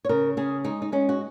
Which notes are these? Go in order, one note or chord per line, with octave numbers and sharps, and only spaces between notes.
C#5
C#3 A#4
C#3 G#4
G#3 D#4
D#4
G#3 C#4
F#4